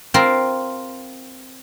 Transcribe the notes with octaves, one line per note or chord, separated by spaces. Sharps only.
C4 F4 A#4 C5